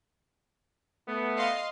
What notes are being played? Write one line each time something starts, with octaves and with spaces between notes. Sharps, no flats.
A3 B3
D#5 F5 C6